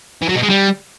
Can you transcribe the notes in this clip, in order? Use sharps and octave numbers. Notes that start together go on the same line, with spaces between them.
E3
F#3
B2
G#3
G3